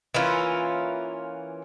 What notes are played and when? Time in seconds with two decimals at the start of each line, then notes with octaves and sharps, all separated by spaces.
0.14 E3 A#3 C#4 F4